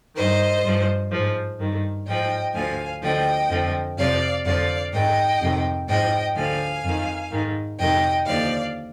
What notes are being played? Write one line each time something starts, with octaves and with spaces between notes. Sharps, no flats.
G2 D#3 C5 D#5
G2 F3
G#2 F3
G2 D#3
G#2 F3 D#5 G5
D2 D3 F3 F5 G#5
D2 D3 F3 D#5 G5
F2 D3 F3
F2 C3 F3 D5 F5
F2 D3 F3 D5 F5
G#2 D#3 D#5 G5
F2 C3 D#3
G#2 F3 D#5 G5
D2 D3 F3 F5 G#5
F2 D#3
G#2 D#3
F2 C3 D#3 D#5 G5
D#2 D3 F3 D5 F5